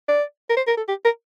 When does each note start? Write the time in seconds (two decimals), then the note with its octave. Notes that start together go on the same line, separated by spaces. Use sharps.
0.08 D5
0.49 A#4
0.56 C5
0.67 A#4
0.77 A4
0.88 G4
1.05 A#4